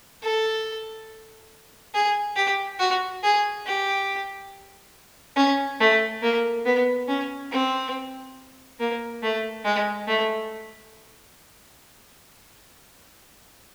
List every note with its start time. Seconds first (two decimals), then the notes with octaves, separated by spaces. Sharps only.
0.23 A4
1.94 G#4
2.36 G4
2.79 F#4
3.23 G#4
3.66 G4
5.36 C#4
5.80 A3
6.22 A#3
6.65 B3
7.08 C#4
7.52 C4
8.80 A#3
9.23 A3
9.65 G#3
10.07 A3